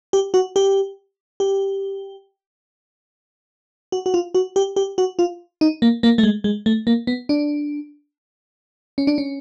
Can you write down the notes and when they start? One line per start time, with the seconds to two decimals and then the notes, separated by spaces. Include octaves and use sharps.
0.13 G4
0.34 F#4
0.56 G4
1.40 G4
3.92 F#4
4.06 F#4
4.14 F4
4.35 F#4
4.56 G4
4.76 G4
4.98 F#4
5.19 F4
5.61 D#4
5.82 A#3
6.03 A#3
6.18 A3
6.23 G#3
6.44 G#3
6.66 A3
6.87 A#3
7.07 B3
7.29 D4
8.98 C#4
9.07 D4
9.18 C#4